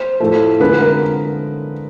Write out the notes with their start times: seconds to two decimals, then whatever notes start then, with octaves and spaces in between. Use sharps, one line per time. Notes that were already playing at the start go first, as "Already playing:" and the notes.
Already playing: C5
0.20 A2 F3 A3
0.60 D3 F3 G#3 B3 B4
0.81 A#4